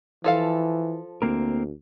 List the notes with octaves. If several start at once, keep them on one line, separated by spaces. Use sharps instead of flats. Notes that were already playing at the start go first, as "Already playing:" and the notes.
E3 F3 A4 F5
D2 A#3 C4 A#4